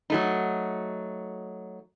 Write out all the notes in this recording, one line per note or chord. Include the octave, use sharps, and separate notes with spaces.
F#3 A3 D#4